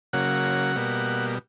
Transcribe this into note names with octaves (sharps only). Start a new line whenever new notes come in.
C#3 F#3 A#3 F#5
B2 G3 A#3